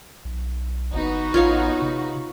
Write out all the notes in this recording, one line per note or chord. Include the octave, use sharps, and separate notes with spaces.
B1
G1 B3 D#4 F#4
A1 F4 C#5 F5
C3